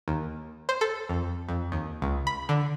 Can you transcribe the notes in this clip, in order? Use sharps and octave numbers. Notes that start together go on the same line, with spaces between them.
D#2
C5
A4
F2
F2
D#2
C#2
B5
D3